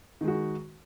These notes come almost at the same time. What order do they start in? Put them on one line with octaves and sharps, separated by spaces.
D#3 G#3 F#4